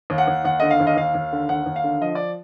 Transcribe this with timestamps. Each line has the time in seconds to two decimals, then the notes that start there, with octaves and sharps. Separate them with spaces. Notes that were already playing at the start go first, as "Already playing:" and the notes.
0.10 D#2
0.18 F#5
0.28 D#2
0.45 D#2 F#5
0.60 D3 D#5
0.71 F5
0.80 D#2
0.87 D#5
0.97 D#2 F5
1.14 D#2
1.33 D3
1.49 D#2 F#5
1.66 D#2
1.76 F5
1.84 D3
2.01 F3 D#5
2.15 D5